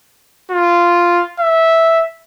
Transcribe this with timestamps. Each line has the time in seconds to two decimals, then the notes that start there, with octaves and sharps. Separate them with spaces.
0.52 F4
1.40 E5